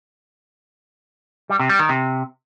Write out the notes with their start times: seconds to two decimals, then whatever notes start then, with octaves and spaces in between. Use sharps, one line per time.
1.50 G3
1.59 C3
1.69 G3
1.79 D#3
1.89 C3